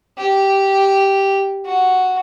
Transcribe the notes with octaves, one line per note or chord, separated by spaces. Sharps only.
G4
F#4